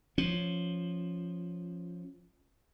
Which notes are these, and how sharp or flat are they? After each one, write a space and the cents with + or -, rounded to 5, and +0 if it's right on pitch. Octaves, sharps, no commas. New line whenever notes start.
F3 +0 C#4 +0